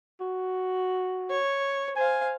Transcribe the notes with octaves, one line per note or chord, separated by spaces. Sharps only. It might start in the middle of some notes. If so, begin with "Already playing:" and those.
F#4
C#5
C5 F5 G#5